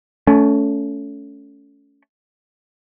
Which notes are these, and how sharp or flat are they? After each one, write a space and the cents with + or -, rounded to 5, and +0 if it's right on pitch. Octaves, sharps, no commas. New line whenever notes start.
A3 +0 C#4 +25